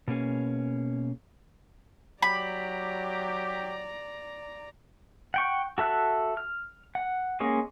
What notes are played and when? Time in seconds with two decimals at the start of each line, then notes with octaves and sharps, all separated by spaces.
0.08 B2 A#3 C#4 G#4
2.22 F#3 G4 D5 A#5 B5
5.34 F#5 G5 C#6
5.78 F#4 A4 E5 F#6
6.37 F6
6.95 F#5
7.40 G#3 A#3 C#4 G#4